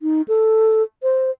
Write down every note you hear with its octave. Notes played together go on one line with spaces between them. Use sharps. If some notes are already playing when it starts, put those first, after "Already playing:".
D#4
A4
C5